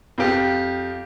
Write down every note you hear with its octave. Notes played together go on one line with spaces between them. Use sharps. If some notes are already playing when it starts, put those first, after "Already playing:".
F2 F4 G4